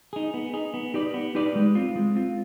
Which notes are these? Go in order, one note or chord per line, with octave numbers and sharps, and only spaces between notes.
D#4 G#4
B3
D#4 G#4
B3
D#4 G4 B4 D5
B3
D#4 G4 B4 D5
G#3
C4 F4
G#3
C4 F4